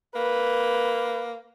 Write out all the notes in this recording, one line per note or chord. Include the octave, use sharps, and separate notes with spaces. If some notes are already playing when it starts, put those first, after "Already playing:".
A#3 B4